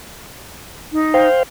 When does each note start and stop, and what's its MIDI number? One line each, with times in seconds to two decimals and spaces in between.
0.92 1.27 63
1.14 1.43 72
1.14 1.43 77
1.14 1.43 79